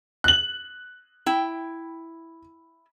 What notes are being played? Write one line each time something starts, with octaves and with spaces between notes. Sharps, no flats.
F#6 F#7
E4 G5